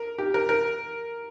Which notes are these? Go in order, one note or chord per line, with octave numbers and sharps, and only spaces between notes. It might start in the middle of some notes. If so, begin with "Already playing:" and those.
Already playing: A#4
G4
A#4
A#4